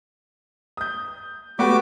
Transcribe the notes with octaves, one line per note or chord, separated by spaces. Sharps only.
D#6 G6
A3 B3 F#4 G4 D6